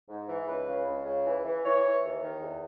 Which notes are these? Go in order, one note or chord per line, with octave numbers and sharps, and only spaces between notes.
G#2
E3
C#2 B4
C#3
C#2
C#3
E3
E3
E3 C#5
E3
D#2
D#3
E2